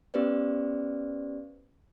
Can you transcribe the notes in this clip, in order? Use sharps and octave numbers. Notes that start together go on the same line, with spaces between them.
B3 C#4 G4 B4 C5 D5